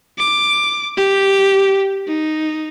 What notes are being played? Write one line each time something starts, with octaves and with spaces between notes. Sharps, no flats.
D6
G4
D#4